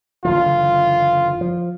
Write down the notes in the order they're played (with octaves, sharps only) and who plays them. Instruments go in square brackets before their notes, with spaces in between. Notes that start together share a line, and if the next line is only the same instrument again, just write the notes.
[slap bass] F#1 D3 E3 [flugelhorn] F4
[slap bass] F3